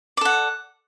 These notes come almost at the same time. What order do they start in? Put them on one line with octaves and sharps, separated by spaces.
D5 A4 F#5